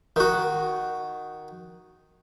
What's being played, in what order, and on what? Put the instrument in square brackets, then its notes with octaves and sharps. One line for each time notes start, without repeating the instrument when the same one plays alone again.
[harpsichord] D#3 F#4